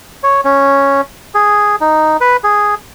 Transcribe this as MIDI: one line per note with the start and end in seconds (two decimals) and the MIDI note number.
0.23 0.41 73
0.45 1.01 61
1.35 1.76 68
1.81 2.17 63
2.21 2.37 71
2.44 2.75 68